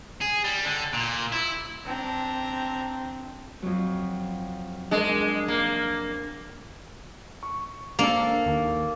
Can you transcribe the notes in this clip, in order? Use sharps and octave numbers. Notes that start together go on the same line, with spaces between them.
G#4
G3
D3
A#2
E4
C4 D4 A#5
F2 F#3
G#3 D4 A#4
A#3
C#6
A#3 D4 A4 C5
D#2